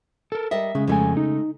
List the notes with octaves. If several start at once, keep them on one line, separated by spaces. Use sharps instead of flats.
A4 A#4
G3 A#4 D#5 E5
C#3 G#3
F2 G#3 A3 E4 G#5
D#4